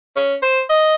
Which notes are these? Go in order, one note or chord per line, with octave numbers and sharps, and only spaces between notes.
C#4
C5
D#5